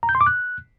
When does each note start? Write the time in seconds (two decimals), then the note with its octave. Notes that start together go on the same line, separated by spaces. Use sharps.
0.03 A#5
0.09 G6
0.15 C6
0.21 D6
0.26 F#6